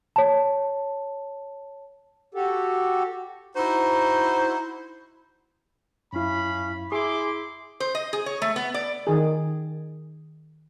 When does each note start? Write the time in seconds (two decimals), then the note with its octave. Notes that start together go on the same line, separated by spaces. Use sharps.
0.16 C#5 A5
2.34 F#4 G4 A4
3.55 D#4 E4 F#4 C5
6.13 F#2 C#4 E4 F5 B5
6.92 E4 G#4 C6 D6
7.80 C5
7.95 D#5
8.13 G#4
8.26 C#5
8.42 A3
8.56 B3
8.74 D5
9.07 D#3 G#4